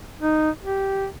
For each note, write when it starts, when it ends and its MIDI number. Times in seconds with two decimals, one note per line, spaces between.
0.21 0.50 63
0.63 1.07 67